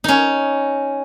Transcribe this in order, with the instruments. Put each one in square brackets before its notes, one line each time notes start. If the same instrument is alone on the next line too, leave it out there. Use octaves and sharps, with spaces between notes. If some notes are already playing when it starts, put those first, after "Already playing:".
[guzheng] C#4 D#4